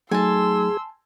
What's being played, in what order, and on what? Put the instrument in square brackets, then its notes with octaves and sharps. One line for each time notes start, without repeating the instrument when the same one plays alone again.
[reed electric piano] F#3 A3 D#4 [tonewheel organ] G#4 [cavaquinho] G#5 A5 [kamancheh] C6 E6